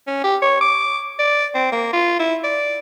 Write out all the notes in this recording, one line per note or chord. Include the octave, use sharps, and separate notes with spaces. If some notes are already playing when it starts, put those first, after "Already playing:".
C#4
G4
C#5
D6
D5
C4
A#3
F4
E4
D5